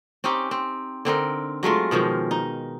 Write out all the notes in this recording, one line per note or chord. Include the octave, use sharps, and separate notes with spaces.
C4 C#4 D#4 G4
C4
D3 C4 D#4 A#4
F#3 G#3 A3 F4
B2 D#3 F3 G#3
D#4